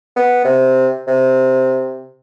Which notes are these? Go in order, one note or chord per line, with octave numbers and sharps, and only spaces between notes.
B3
C3
C3